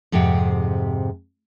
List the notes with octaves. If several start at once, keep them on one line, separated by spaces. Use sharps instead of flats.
F2 G#2 C3 G4 G#4 F#5